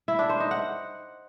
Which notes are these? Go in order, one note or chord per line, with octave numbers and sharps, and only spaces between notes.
E4
D4
C5
D#4
F#5